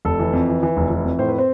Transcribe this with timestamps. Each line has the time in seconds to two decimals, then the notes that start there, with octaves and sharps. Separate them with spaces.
0.05 F1 A4
0.19 E3
0.33 F2
0.48 E3
0.63 E3
0.77 F1
0.90 E3
1.05 F2
1.18 A2 C5
1.29 B4
1.38 C4 C5